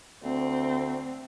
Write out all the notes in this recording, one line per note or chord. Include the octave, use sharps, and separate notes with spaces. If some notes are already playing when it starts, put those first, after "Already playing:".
D2 C4